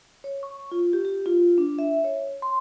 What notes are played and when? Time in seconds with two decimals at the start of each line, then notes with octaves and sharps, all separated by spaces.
0.24 C#5
0.43 C#6
0.72 F4
0.93 G4
1.05 G4
1.26 F4
1.58 D4
1.79 E5
2.04 C#5
2.42 C6